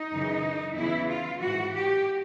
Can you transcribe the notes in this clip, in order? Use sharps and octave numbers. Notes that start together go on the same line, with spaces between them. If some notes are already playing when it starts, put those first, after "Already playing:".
Already playing: D#4
F#2 C#3 E3
E2 C#3 E3 E4
F4
G#2 E3 F#4
G4